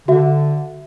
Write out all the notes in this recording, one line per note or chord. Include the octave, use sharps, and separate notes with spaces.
D3 F#4 E5